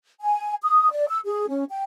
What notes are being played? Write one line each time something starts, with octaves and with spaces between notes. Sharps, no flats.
G#5
D#6
D5
E6
G#4
C#4
G5